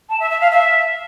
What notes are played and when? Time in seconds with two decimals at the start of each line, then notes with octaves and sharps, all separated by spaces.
0.09 A5
0.20 E5
0.30 E5
0.41 F5
0.51 E5